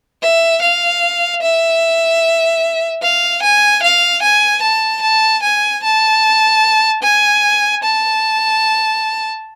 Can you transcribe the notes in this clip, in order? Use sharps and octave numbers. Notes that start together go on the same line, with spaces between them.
E5
F5
E5
F5
G#5
F5
G#5
A5
A5
G#5
A5
G#5
A5